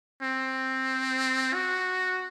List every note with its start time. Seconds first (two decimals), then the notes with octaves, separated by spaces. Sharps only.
0.22 C4
1.54 F#4